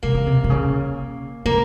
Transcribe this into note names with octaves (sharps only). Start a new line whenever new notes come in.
C3 A#3
C#3
C3
C3
C#3
C#3 A#3